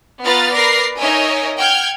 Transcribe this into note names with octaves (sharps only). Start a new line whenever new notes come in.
B3 F4 B4 A#5 F6 A6
A#4 B4 D5 A#6 C7
D#4 A#4 C#5 D#5 E5 G#5
F#5 G5 F6 G6 G#6